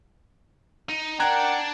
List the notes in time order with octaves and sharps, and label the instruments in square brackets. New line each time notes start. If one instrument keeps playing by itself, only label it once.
[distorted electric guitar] D#4
[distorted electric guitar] D4 D5 [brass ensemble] A#4 G5 [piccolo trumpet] F#5 [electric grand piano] A#5 F#6 G#6